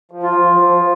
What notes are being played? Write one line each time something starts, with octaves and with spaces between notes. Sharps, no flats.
F3
F4
F3
F3